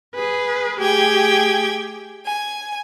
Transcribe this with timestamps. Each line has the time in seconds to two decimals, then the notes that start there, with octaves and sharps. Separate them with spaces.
0.15 G#4 B4
0.79 A3 G4 G#4 G5 G#6
2.24 G#5